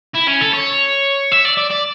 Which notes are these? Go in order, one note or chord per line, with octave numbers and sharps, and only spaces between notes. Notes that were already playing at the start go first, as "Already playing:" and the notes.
E4
C#4
A4
C#5
E5
D5
D5
D5